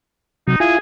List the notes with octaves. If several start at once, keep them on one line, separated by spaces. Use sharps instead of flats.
C3 F#3 D#4
E4 F4 G#4 G#5